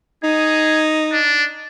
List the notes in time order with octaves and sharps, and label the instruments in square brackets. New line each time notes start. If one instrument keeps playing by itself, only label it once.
[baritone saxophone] D#4 [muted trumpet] G#4
[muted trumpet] D4